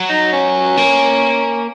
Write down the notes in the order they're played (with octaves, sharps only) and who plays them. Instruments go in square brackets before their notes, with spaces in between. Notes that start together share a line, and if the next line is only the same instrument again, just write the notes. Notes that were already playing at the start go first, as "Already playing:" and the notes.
Already playing: [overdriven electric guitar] F#3
[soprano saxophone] D#4
C#4
[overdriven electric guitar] A#3